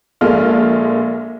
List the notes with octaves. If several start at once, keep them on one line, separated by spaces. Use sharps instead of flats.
A#1 A#2 G#3 A4 F5 F6